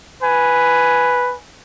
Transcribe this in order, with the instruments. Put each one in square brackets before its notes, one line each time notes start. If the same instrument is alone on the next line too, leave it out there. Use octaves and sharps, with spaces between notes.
[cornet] B4 [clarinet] G#5